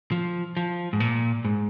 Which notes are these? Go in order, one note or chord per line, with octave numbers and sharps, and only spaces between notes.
F3
F3
G#2
A#2
G#2